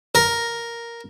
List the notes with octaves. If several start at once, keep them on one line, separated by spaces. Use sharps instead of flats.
A#4